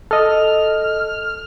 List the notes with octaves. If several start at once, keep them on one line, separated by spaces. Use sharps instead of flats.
A4 D#5 F6